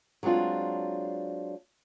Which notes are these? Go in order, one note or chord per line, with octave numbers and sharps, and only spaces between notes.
F#3 G#3 C4 D4 F4